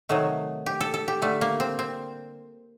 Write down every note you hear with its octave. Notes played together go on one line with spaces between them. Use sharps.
C3 D#3 F#3 A3
G4
A4
A4
G4
D3 G3 A3
A#3
C4
C4